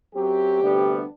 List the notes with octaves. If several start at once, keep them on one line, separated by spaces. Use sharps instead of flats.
F#2 F#3 C4 G4
D2 C3 G3 B3 D4